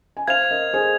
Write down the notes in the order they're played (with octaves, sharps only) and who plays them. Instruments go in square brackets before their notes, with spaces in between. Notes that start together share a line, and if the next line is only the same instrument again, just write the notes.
[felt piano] G#5
[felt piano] C5 F5 [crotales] G#6 F7
[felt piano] A#4 D#5
G#4 C5